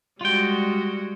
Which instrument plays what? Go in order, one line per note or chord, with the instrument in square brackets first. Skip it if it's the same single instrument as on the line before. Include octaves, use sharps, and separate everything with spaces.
[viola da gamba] G3 G#3 F#4 [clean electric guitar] F4 G5